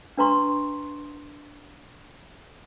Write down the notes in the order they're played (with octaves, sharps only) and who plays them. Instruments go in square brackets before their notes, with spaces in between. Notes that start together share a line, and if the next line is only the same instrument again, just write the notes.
[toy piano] D4 B4 A#5 C6 C#6